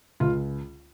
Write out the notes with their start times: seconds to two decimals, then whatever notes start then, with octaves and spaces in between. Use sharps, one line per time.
0.20 C#2 F4